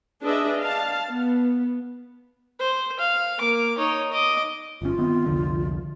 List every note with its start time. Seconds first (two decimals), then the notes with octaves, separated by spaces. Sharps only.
0.23 D4 G#4 B4 D#5 E5
0.59 F5 A5
1.09 B3
2.60 C5
2.99 F5
3.39 A#3 D6
3.78 D#4 C#5
4.12 D#5 D6
4.82 G1 C#4 F4
4.98 D#3 B3 C4
5.26 C2 F2 D3